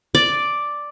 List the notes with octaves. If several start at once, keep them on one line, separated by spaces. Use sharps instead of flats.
D5